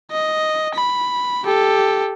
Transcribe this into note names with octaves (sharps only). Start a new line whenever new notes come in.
D#5
B5
G4 A4